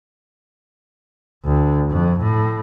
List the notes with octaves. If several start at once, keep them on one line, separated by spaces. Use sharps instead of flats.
D2
F2
A2